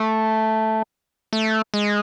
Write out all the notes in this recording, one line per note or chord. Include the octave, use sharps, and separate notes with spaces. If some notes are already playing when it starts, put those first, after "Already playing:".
Already playing: A3
A3
G#3